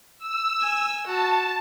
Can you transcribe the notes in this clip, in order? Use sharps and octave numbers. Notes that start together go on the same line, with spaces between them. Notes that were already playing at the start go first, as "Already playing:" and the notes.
E6
G#5
F#4 A5